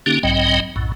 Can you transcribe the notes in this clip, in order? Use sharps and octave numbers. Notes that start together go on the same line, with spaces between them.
D3 A#3 C#4 D#4 G4
B1 G#2 F#3 C4 D#5 G5
B1 F#2 A2